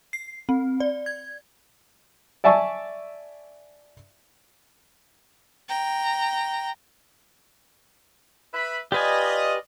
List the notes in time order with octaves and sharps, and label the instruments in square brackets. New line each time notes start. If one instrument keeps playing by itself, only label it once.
[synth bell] C7
C4
D5
G#6
[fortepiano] D5 E5 G#5 A5 C#6 E6
[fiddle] G5 A#5
[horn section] B4 E5 B5
[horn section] F4 D5 D#5 [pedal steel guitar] G4 B4 G#5